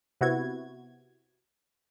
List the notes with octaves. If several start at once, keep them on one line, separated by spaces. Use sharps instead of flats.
C3 B3 E4 F#4 G#6